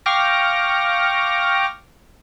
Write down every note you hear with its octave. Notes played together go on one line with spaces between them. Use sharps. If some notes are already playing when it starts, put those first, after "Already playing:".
F5 G5 C#6 D6 F6 A#6